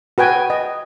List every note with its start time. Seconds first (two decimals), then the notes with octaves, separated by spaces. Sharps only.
0.18 F#4 B4 G5 G#5
0.50 D#5